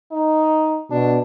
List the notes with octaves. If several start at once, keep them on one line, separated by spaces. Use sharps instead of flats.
D#4
B2 D4